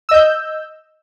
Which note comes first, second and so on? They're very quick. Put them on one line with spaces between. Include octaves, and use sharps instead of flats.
E6 D#5 G6